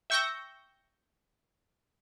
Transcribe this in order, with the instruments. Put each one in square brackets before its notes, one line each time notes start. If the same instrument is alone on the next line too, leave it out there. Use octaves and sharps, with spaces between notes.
[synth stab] E5 G5 C#6 E6 G6 A#6